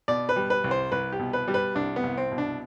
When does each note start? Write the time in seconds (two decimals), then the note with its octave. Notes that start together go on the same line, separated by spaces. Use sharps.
0.08 B2 D5
0.29 B4
0.36 G3
0.50 B4
0.64 C2
0.71 C5
0.92 C2 B4
1.12 G4
1.19 B2
1.33 B4
1.48 G3
1.54 B4
1.75 C2 D4
1.96 B3
2.03 C2
2.17 C4
2.32 B2
2.38 D4